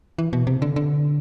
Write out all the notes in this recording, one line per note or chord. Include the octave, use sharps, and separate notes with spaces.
E3
B2
C3
D3
D3